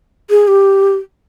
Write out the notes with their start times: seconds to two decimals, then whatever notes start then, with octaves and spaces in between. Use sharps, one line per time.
0.30 G#4
0.48 G4